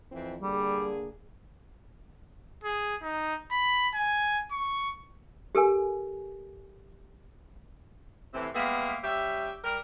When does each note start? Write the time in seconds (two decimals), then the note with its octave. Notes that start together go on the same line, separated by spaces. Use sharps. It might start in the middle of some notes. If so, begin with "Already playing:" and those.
0.11 F2 E3 C4
0.42 D3 G3 A#3 G#4
2.64 G#4
3.02 D#4
3.51 B5
3.95 G#5
4.52 C#6
5.55 G4 A4 A#4 G#5
8.34 A2 C3 E3 C4
8.55 G3 G#3 A#3 B3 E5
9.04 G3 C#4 G4 E5
9.64 G3 A#4